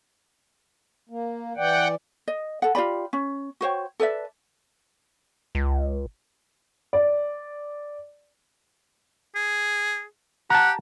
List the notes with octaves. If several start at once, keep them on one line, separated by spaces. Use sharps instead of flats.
A#3
E3 D5 F#5 G5
D#5
A4 F#5
F4 G4 D5 B5
C#4
F#4 C5 C#5 G5
A4 B4 D5 E5
C#2
D5
G#4
G4 F#5 A5 A#5